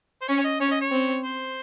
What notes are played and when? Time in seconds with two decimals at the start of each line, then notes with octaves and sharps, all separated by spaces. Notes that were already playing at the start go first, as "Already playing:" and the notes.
0.21 C5
0.28 C#4 C#5
0.39 C#5
0.44 D#5
0.60 C#4 C#5
0.71 D#5
0.81 C#5
0.91 C4
1.23 C5